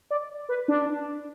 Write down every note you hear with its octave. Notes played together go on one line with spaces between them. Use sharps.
D5
B4
D4